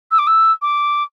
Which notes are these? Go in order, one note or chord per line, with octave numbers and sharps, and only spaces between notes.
E6
D6
E6
D6